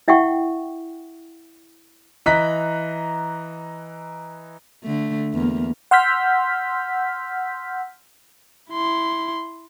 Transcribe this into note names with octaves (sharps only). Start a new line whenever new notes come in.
E4 E5 F#5 G5 C#6
E3 D#5 A#5 F#6 B6
D3 A3
E2 A#3
F#5 C6 E6 F6 G6 B6
E4 C6